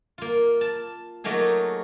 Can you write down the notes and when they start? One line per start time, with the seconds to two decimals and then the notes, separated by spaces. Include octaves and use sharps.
0.18 A#3 F4
0.61 A5
1.24 F#3 A3 A#3 D#4 G#4